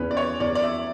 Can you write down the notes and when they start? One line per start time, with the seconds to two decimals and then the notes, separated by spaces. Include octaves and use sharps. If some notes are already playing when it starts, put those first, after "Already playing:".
Already playing: E2 C#4 B4
0.11 D5
0.17 C#5
0.40 E2 D5
0.55 D5
0.63 E5